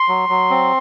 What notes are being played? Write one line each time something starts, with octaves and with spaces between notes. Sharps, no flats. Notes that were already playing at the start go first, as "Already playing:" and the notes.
Already playing: C6
F#3
F#3
C4